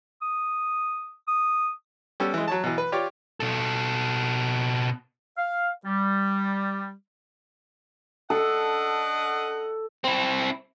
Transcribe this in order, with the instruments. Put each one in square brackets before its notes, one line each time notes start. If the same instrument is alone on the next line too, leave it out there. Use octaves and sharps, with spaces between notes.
[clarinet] D#6
D#6
[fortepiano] G3 B3 C#4 A4 E6
E3 G#3
F#3 C#5 A5
B2 E3
B4
F4 G4 C#5 D5
[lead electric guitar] B2 A4
[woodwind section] F5
G3
[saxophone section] D4 D#5 F#5 [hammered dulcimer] A4
[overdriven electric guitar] C4 E4